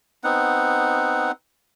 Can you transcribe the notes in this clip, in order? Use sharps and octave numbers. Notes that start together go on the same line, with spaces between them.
B3 C4 D#4 F#5